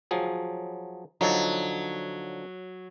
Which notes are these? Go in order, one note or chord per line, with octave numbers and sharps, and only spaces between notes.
F3 F#3 G#4
D3 F3 F#3 D#4